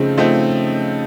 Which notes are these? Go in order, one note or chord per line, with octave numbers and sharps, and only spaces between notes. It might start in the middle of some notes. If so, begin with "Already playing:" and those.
Already playing: C#3 F3 A3 C4 D#4
F3 A3 C4 D#4